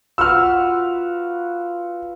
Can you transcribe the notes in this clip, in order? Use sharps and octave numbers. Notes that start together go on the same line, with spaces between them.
F4 F#4 B4 E6 F6